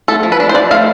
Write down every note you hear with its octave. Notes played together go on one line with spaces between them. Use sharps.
A3 A4
F3
B4
D4
C5
F3 D5
A3 F5